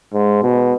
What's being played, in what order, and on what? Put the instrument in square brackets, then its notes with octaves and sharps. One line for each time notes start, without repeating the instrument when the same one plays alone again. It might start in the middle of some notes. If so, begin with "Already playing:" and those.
[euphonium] G#2
B2